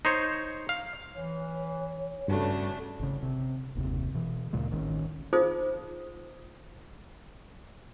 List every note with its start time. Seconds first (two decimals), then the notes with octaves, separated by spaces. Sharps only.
0.05 D#4 C5 C#5
0.69 F5
1.15 E3 C#5
2.28 G2 C#3 A3 D4 F#4
3.00 G#1 C#3
3.23 C3
3.75 F#1 D#2 C3
4.14 B2 E3
4.53 D2 A#2 C#3 G#3
4.71 A1 D#3 B3 C#4
5.33 D#4 F4 G#4 C5 F5 D#6